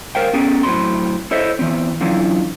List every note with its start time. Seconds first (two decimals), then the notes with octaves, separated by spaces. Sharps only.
0.15 A#4 C5 F5 G5
0.33 B3 C#4 G#4 A4 G5
0.63 A2 F#3 C4 B5 C6
1.31 E4 A4 C5 C#5 D#5 E5
1.59 E3 B3 C4
2.01 D3 E3 F#3 C4 C#4 F4